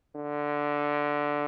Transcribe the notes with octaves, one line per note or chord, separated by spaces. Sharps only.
D3